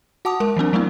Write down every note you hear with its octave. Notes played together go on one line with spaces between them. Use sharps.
F#4 F#5 A5 D6 D#6
G#3 A#4
E3 F#3 C4 D4
F#3 A3 B3 C4 E4